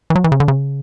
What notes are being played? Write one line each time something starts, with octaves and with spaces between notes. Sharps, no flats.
E3
F#3
E3
C#3
D3
C#3